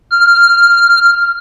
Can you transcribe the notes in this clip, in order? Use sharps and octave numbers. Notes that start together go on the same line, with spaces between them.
F6